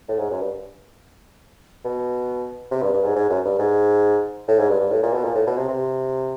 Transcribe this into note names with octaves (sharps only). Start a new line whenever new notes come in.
A2
G#2
F#2
G2
B2
C3
G2
G2
G#2
G#2
F#2
G2
G#2
A2
G#2
G2
G2
A2
A#2
B2
A#2
A2
B2
C3
C3